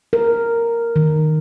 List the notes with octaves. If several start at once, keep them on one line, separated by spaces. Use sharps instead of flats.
A#4
D#3